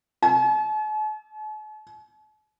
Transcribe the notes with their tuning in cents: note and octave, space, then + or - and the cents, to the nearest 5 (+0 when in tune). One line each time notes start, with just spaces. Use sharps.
A5 -45